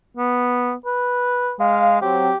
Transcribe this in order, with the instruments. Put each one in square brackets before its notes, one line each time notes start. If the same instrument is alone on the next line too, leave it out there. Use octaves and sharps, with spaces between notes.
[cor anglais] B3
B4
[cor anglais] G#3 [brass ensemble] F5
[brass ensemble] F#3 C4 [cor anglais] G4